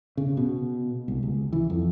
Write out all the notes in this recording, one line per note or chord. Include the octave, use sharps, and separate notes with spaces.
C#3
B2
C2
C#2
E3
F2